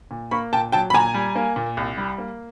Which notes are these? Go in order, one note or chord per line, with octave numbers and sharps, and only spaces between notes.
A#2
A#3 B5 C#6
A#2 G5 A5
F#3 G5 A5
B5
A#2 G#5 A#5
G3
A#3
A#2
C2
G3
A#3